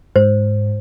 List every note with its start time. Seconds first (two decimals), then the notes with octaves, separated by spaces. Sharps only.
0.16 G#2 C5